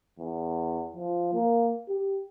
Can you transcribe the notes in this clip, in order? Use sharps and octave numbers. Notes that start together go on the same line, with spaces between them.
E2
F3
A#3
G4